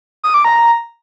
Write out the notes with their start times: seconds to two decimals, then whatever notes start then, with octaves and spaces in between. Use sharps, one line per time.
0.24 D#6
0.34 D6
0.45 A#5